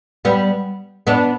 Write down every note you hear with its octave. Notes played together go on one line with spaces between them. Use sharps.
G3 B3
B3 D4